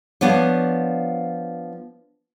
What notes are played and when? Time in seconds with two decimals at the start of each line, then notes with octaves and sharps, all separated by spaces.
0.21 F3 B3 D4 C#5